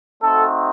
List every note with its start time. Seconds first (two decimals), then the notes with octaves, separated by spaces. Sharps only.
0.22 A3 C4 D#4 F#4 A4